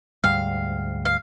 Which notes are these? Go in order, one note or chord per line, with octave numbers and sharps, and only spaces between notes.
D2 G#2 G3 F5
F5